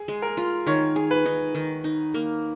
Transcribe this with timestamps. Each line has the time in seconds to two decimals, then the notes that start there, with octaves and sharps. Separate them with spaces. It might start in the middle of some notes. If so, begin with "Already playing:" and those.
Already playing: G#4
0.08 G#3
0.22 A#4
0.37 F4
0.67 D#3 C#5
0.96 G#4
1.11 B4
1.26 D#4
1.55 D#3
1.84 D#4
2.14 A#3